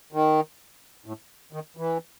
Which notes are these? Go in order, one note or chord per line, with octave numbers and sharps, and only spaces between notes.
D#3
A2
D#3
E3